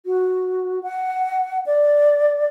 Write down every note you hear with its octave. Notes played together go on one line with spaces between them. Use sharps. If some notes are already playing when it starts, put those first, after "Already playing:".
F#4
F#5
D5